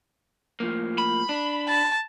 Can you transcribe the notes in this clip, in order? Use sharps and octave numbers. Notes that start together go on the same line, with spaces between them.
A2 F3 A#3
B5
D4
A5